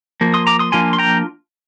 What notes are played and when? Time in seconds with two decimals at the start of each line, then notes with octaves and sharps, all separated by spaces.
0.21 F3 A#3
0.34 C6 D#6
0.47 A#5 D6
0.59 C6 D#6
0.72 F3 A#3 D4 F4 G#5 C6
0.93 C6
0.98 G5 A#5